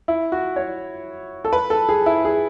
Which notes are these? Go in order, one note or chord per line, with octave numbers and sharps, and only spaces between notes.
E4
F#4
C#5
A4
B4
A4
G#4
E4
G#4